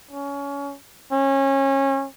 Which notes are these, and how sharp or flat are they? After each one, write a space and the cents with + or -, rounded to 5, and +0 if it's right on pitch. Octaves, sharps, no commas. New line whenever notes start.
C#4 +25
C#4 -25